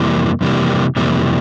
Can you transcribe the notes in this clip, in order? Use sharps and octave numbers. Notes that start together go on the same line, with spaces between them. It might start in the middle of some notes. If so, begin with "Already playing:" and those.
Already playing: F2 C3 E3 G3 A#3
F2 C3 E3 G3 A#3
F2 C3 E3 G3 A#3